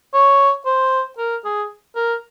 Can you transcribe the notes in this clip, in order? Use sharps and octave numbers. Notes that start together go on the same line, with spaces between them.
C#5
C5
A#4
G#4
A#4